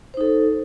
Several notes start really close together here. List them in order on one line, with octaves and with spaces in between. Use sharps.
C5 D#4 A4